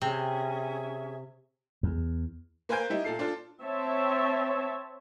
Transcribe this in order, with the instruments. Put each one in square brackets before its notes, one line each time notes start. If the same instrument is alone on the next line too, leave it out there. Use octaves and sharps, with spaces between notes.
[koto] C3 [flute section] C#4 G#4 E5
[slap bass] E2
[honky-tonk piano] A#3 B4 C5 G#5 G6 D7
G3 D#4 E4
A#2 A4 C7
D4 F4 A4
[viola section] C4 C#5 E5 A5